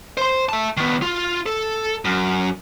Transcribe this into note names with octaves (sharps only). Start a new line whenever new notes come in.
C5 C6
E5 A5
D#3 B3
F4
A4
F#2